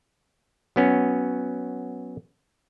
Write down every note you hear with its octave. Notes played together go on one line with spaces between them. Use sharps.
F#3 B3 C#4